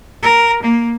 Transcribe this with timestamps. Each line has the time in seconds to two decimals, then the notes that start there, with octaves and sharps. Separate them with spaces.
0.23 A#4
0.63 A#3